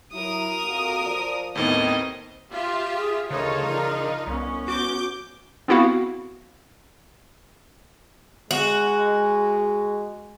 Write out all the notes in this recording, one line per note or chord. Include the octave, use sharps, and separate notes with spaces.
F#3 E4 A#4 D#6
F2 A#3 F#4
F3 D5
D#2 A2 D#3 B3 C4 D#5
F4 G4 E5
G#4
D2 C#3 D#4 F4 A4 A#4 C#5
F3 D4 A#4
C2 B3 C#4
F#4 D6 G6
B3 C4 E4 F#4 F5
G#3 F#4